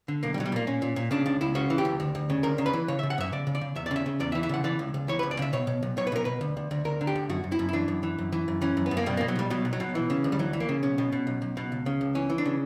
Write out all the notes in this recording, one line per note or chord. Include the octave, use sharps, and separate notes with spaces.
D3
B1 A#3
G3
B1 F#3
G3
A#2 A#3
A#2 C#4
A#2
A#2
C#3 D4
C#2 D4
C#2 E4
C#3 F#4
E3
G4
C#2
D2
D2
C#3
D2 A#4
C#3
B4
E3
C#3 C#5
E5
C#3
F#5
F#2 E5
C#3 D5
C#3
D5
C#3
E2 E5
D5
C#3
E5
C#3
E2 D5
E5
E3
E5
C#3 F#5
E3 D5
C#2
C#2
E3 C#5
B4
C#2
D5
C#3 E5
B2 C#5
B2
B1
B1 C#5
B4
B1 A#4
B2 B4
D2
D2
D2
D2 A#4
D3
G4
D2
F#2 F#4
F#2
E4
F#2
E4
E3 D4
F#2
E3
F#2
E3
F#2
E3 C#4
F#2
B3
F#2
A#3
B2 G3
A#3
B2
F#3
B1 G3
B2 F#3
B1
F#3
B2
E3
C#3
D2
G3
E3 F#3
E3
A#3
C#3
B1 C#4
B2
B2
B1
B1
B2
C#2
C#3
C#2
E3 C#4
E3
D4
C#3